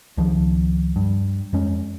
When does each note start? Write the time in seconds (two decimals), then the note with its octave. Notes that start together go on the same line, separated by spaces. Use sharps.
0.17 C#2 D#3 F3
0.96 G2
1.53 F2 G#3 C#4